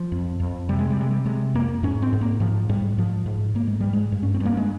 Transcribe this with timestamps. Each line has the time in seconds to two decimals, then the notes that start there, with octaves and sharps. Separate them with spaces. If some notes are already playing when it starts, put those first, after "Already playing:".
Already playing: F3
0.12 F2
0.40 F2
0.69 C3 G3
0.79 G#3
0.90 G3
0.97 C3 G#3
1.11 G3
1.25 C3 G#3
1.54 F2 A#3
1.83 G#2 C#4
2.02 C4
2.13 G#2
2.21 A#3
2.40 G#2 F3
2.69 G#2 G3
2.98 G#2 F3
3.26 G#2
3.55 G#2 A#3
3.67 G#3
3.80 G#2 G3
3.93 G#3
4.12 G2
4.23 C#4
4.34 C4
4.40 G2
4.45 A#3
4.57 G#3